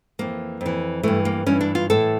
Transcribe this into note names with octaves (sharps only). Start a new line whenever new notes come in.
F2 E3 A#3
F2 E3
G2 E3 A3
A#3
G2 E3 C#4
D4
F4
A2 E3 A4